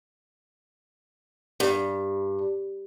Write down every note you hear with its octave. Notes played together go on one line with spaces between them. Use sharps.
G2